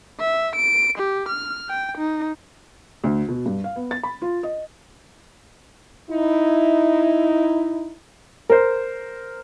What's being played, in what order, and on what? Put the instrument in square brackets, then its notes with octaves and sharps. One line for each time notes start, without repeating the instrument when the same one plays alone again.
[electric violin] E5
D7
G4
F6
G5
D#4
[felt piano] D2
B2
G2
F5
B3
A6
B5
F4
D#5
[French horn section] D#4 E4
[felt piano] A#4 C5